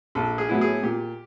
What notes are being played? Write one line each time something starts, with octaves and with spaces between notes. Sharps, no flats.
A#1 A4
G#4
A2 F#3 B3 E4
G#4
A#2 G4